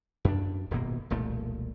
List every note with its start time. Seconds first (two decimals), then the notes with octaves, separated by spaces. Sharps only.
0.25 F#2 D4
0.71 D#1 G#1 B2 A#3
1.10 E1 C2 A#2 A3